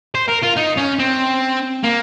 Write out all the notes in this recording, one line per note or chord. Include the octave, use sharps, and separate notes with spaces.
C5
A#4
F4
D#4
C#4
C4
A#3